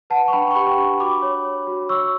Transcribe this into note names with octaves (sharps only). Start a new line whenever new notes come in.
B4 F#5 A5
C#6
D4 G5 B5
C#6
G4 G5 B5
D4
F#4 B5 D6
C#5
C#5
F#4
C#5 C#6 E6